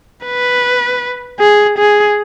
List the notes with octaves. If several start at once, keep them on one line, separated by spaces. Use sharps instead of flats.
B4
G#4
G#4